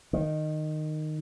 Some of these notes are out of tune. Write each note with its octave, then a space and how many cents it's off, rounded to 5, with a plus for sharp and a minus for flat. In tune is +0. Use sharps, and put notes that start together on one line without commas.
D#3 -15